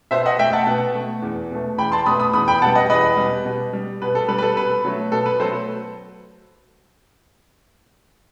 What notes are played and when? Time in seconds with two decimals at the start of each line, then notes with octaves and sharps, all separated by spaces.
0.11 B2 C5 E5
0.26 D#5 F#5
0.39 A3 E5 G5
0.53 F#5 A5
0.67 B2
0.95 A3
1.22 E2
1.51 B2 A3
1.78 E2 G5 B5
1.92 A5 C6
2.06 B2 A3 B5 D#6
2.20 B5 D#6
2.33 E2 B5 D#6
2.48 G5 B5
2.62 B2 G3 F#5 A5
2.75 D#5 F#5
2.90 E2 B4 D#5
3.17 B2 G3
3.45 B2
3.73 G3
4.02 B2 B4
4.15 A4
4.28 G3 B4
4.38 B4
4.42 A4
4.56 B2 B4
4.85 F#3 A3
5.12 B2 A4
5.26 B4
5.40 F#3 A4 C5
5.45 A3